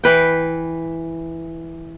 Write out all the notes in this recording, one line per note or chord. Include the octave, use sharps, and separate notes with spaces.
E3 B4 G5